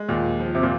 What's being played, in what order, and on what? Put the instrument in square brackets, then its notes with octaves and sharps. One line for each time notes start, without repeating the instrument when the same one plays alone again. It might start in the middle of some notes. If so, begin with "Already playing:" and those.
Already playing: [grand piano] G#3
[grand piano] D#2 [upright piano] A#2
[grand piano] F3
[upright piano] C3
A#2